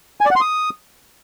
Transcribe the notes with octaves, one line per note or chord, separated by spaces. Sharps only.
G#5
D5
F#5
C6
D#6